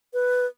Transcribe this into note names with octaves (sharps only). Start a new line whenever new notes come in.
B4